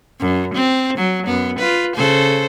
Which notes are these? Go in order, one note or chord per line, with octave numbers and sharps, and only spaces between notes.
F#2
C4
F#3
F#2 B3
F4 B4
C#3 A4 C5